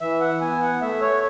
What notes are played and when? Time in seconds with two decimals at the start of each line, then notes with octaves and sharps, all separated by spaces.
0.01 E3 E5
0.20 F#5
0.41 B3 G#5
0.62 F#5
0.82 A3 E5
1.01 C#5